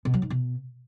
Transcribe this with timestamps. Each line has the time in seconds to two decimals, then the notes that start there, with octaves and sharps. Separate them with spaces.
0.05 B2
0.14 F#3
0.22 G#2
0.30 B2